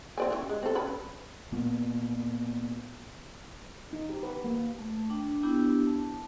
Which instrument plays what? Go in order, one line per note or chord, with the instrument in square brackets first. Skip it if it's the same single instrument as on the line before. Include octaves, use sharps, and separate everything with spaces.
[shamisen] C4 D5 G#5
E3 F3 C#4
G#3
C4 A4
C#4 B4 B5
[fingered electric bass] A#2 A#3 B3
[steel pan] D#4
G4
B4
A#3
[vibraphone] A3
D4 G5
B3 D4 E4 G4
A5